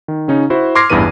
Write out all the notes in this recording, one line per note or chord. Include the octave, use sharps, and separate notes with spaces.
D#3
C#3 C#4 D#4
E4 F#4 C5
C6 D6 F6 G#6 A#6 C7
A1 E2 G2 E3 B4 D#7